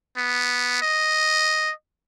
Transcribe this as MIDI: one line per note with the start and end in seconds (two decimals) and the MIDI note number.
0.17 0.80 59
0.82 1.72 75